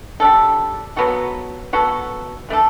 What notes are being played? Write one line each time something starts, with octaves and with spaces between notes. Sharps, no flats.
G3 D4 A4
F#3 B3 F#4 A4
F#3 B3 F#4 A4
E3 A3 D4 A4